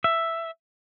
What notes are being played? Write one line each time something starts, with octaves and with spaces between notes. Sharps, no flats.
E5